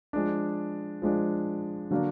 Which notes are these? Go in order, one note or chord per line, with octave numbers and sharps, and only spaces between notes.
F3 G#3 D4
F3 G#3 D4
D3 F#3 A#3 D4